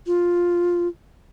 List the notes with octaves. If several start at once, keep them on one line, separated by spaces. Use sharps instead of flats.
F4